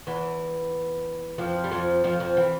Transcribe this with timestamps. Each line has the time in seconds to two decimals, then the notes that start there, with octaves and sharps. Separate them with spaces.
0.07 E2 E3
1.38 F2 F3
1.64 G3
1.71 F2 F3
2.04 F2 F3
2.20 F2 F3
2.37 E3